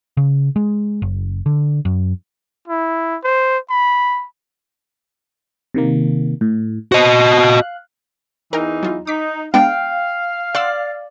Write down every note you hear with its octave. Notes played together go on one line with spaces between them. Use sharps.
C#3
G#3
F#1
D3
F#2
E4
C5
B5
C3 D#3 A#3
A2
F#4 C5 D#5
F5 F#6
E2 E3 D#4 A#4 G5
F#3 F4
D#4 D6 B6
G#3 B3 D4 F5 G5
D5 F#5 C6 E6